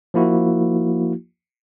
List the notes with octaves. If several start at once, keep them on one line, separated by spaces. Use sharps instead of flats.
F3 A#3 E4 F#4